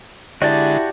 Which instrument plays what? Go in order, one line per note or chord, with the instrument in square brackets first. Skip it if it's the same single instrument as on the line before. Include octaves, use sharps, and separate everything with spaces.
[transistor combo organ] D3 G#3 [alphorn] E4 [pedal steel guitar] F#4 G4 A5 [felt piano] D5